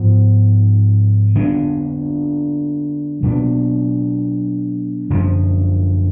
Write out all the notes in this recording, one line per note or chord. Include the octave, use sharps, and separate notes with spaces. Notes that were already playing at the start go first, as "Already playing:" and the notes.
Already playing: G#2 F3 B3
D3 G#3 B3 D4
B2 F#3 B3 D4
F#2 D3 F3